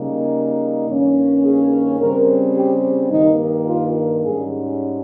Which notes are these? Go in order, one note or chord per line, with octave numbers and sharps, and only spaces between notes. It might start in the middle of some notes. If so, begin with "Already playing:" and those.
Already playing: C#3 G3 A#3 D#4
G2 D#3 A#3 C#4
G#4
C#3 G3 C4 A#4
G4
G2 D#3 G3 A#3 D#4
F4
G#2 G3 C#4 G#4